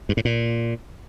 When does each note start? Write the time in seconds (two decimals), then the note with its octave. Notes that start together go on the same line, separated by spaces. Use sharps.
0.09 G2
0.17 A2
0.25 A#2